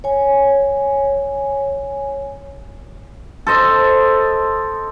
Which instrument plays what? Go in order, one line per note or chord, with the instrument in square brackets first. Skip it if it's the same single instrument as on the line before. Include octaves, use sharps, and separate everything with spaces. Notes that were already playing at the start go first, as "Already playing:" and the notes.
[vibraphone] C#5 G#5
[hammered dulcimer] A4 C5 D#5